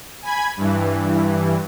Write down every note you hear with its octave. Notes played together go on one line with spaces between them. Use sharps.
G#5 B5 G#6
G2 E3